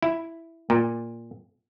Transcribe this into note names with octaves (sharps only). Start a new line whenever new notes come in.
E4
A#2